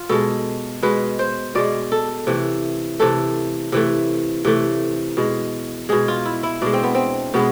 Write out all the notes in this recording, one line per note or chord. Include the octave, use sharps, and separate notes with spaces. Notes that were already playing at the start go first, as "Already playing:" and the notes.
Already playing: F4
B2 G#3 A4
B2 G#3 B4
C5
B2 G#3 D5
A4
C3 E3 A3
C3 E3 A3 A4
C3 E3 A3
C3 E3 A3
B2 G#3
B2 G#3 G#4
F4
E4
E4
B2 G#3 D4
C4
B3
C4
B2 G#3 B3